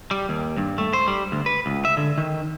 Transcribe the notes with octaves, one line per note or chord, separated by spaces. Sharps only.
G3
D#2
G2
A3
C5
G3
D2
B4
C#2
E5
D3
D#3